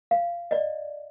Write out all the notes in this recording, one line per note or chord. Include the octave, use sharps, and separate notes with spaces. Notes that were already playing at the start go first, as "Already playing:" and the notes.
F5
D5 D#5